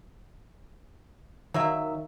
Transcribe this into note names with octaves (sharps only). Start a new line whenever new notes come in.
D#3 F#3 A#3 E5